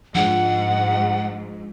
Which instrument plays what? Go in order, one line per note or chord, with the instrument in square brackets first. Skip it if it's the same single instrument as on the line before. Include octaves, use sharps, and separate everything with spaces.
[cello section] G#2 [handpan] F3 D4 [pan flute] F#5